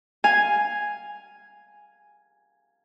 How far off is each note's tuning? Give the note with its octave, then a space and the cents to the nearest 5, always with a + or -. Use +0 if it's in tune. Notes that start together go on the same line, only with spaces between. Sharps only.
F5 +0 G#5 +0